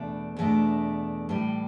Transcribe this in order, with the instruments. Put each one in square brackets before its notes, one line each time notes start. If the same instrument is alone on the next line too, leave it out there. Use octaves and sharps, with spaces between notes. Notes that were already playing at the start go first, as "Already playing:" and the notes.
Already playing: [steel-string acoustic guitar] E2 B2 A3 D4
E2 B2 A3 D4
A2 E3 G3